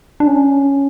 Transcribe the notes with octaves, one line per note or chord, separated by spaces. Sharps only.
D4
C#4